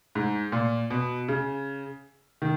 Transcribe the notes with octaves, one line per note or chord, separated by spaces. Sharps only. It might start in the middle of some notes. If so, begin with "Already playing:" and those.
G#2
A#2
B2
C#3
D#3